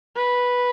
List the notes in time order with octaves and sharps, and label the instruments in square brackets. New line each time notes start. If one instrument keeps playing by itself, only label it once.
[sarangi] B4